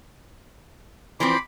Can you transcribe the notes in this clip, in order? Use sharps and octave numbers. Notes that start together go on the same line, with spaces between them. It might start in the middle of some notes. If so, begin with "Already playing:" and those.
E3 F3 C4 B5 C6 D6